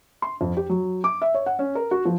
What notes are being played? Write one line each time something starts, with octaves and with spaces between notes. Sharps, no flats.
C6
F2
G4
F#3
D6
E5
C#5
F#5
C#4
A#4
F#4
F3